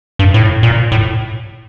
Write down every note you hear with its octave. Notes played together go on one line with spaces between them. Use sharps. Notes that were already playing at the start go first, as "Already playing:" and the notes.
G2
A2
A#2
A2